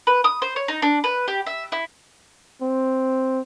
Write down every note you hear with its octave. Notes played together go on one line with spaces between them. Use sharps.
B4
D#6
C5
C#5
D#4
D4
B4
G4
E5
E4
C4